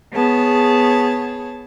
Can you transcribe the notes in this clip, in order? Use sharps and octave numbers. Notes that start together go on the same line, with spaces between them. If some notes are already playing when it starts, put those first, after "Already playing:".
B3 G#4 C#5 A5